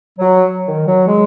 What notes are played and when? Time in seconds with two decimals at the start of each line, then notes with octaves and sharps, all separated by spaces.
0.19 F#3
0.67 D#3
0.87 F#3
1.06 G#3